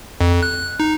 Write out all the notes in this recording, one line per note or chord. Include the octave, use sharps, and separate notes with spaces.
F2
F#6
D#4